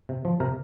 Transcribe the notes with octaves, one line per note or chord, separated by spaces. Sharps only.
C3
F3
C3 A#4